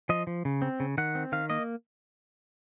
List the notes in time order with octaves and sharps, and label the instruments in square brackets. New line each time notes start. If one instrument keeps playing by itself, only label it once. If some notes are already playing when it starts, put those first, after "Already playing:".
[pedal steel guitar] F3 D#5
F3
C#3
C4
C#3
D#3 F#5
C4
D#3 F5
A#3 D#5